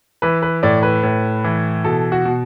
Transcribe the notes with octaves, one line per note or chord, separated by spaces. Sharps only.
E3 B4
B4
A2 D5
B4
A2
E3
B2 A4
F#4
B2